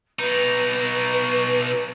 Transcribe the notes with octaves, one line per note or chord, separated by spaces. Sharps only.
B2 D#4 B4